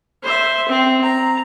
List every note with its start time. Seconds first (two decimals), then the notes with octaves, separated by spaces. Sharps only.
0.23 C5 E5
0.68 C4
1.03 A#5